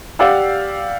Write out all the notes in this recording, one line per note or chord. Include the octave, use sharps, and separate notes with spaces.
G4 D5 F5 F#5 E6